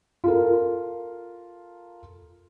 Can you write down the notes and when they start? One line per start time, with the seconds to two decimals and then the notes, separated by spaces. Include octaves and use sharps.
0.24 F4 A4 A#4